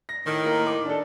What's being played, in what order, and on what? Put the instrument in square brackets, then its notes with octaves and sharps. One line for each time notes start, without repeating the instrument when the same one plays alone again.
[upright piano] A#6
[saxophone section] A2 D#3
[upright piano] A#3 A#4
D6
D4 A4